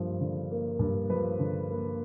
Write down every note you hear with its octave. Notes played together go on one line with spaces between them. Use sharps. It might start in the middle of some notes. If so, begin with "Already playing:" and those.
Already playing: G2 F3 A#3
D3
A#3
G2
F3 B4
D3
A#3